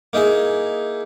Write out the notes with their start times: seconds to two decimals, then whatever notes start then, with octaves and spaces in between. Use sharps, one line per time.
0.13 A#3 D#4 E4 G#4